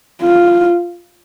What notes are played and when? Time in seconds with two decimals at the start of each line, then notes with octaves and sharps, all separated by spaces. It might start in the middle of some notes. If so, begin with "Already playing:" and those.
0.22 F4